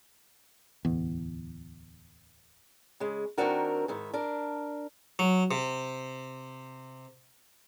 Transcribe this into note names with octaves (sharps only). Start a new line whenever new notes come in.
D1 E2
C#3 G#3
D#3 G#3 C4 D4 F#4 A#4
G#2 D#3 E4
D4 A#4
F#3
C3